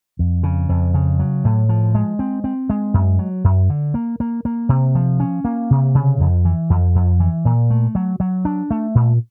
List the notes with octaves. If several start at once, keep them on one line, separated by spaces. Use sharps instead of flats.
F2
C#3
F2
C#3
F#3
A2
F3
G#3
C4
C4
G#3
F#2
F#3
F#2
D3
A#3
A#3
A#3
C3
F3
C#4
A#3
C3
C#3
F2
E3
F2
F2
E3
A#2
A3
F#3
F#3
D4
A3
A#2